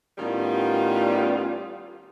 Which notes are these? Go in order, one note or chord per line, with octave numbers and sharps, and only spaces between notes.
A2 D#3 G3 B3 C#4 F4